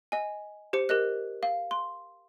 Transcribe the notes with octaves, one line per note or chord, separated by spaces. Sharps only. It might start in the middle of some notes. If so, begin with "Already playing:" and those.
D#5 G#5
G4 C5 C#7
G4 A#4 D#5 F#6
F5
C6